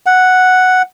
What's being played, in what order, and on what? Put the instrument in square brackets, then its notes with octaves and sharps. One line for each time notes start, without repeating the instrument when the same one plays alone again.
[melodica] F#5